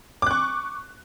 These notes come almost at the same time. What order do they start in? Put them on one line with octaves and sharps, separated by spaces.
D6 F#6 C#6